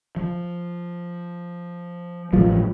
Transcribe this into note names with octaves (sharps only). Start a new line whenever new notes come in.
F3
A1 G#2 F3 F#3 G#3